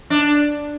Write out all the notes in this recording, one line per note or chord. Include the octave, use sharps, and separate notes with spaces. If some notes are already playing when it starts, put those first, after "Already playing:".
D4